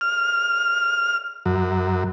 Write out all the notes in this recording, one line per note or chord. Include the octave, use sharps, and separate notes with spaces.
F6
F#2